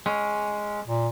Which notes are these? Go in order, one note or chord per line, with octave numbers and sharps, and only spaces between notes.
G#3 C#4
A#2